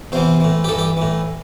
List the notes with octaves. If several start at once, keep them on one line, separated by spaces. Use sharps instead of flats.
E2 C3 E3 C5
A2 E3
G4
G2 E3 A4
G4
A2 E3